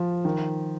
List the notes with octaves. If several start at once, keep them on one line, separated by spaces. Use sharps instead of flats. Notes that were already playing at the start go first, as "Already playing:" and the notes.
Already playing: F3
D#3